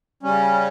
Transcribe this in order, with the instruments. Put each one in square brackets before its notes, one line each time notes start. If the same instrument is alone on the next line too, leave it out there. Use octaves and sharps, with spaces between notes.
[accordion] C#3 G3 C#4